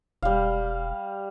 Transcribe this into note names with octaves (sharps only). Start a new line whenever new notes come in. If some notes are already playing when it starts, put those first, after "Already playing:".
E1 G3 F5